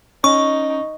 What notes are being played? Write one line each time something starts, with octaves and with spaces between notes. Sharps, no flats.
C#4 D#4 C#6